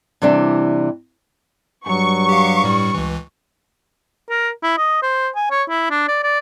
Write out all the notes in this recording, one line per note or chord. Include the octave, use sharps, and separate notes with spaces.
C3 E3 G3 D4
G2 F#3 C#6
G4 F5
A2 G3
C#2 E3
A#4
E4
D#5
C5
G#5
C#5
E4
D4
D5
D5